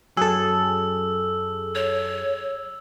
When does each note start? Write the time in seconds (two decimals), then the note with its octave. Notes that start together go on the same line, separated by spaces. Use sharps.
0.17 F#2 F#3 G#4 A4 E6
1.75 C#5